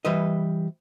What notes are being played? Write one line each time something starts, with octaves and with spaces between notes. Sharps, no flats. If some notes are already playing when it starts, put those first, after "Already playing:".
E3 G3 B4 D#5